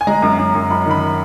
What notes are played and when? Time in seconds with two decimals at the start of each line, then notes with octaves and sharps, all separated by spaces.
0.01 G#5
0.07 G#3 A#5
0.22 F#2
0.39 F#2
0.55 F#2
0.70 F#2 B5
0.86 D#3 B5